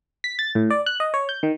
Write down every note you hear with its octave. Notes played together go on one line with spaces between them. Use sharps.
B6
A6
A2
D5
F#6
D#5
C#5
G6
D#3